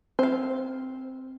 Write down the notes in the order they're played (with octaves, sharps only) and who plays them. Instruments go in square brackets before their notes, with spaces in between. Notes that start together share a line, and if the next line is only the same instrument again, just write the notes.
[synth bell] C4 [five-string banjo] C5 F5